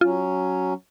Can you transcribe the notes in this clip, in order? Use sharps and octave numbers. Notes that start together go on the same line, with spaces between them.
F#3 C#4 F4